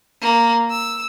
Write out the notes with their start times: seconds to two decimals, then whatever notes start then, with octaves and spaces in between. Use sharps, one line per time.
0.22 A#3
0.71 E6